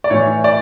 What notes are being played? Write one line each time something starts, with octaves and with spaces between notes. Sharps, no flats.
D5
A2 E3 C#5
D5